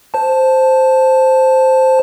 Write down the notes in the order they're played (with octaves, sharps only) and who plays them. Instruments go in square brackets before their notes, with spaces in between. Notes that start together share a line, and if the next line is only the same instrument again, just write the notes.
[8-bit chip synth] C5 A5